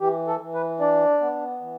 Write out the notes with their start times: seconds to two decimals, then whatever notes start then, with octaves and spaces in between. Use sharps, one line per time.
0.01 E3 G4
0.27 A4
0.41 E3
0.54 B4
0.80 D4 D5
1.21 B3
1.61 E3